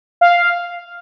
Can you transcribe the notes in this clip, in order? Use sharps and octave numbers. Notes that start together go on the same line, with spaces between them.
F5